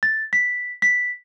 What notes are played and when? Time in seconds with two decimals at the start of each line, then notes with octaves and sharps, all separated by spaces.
0.03 A6
0.33 B6
0.82 B6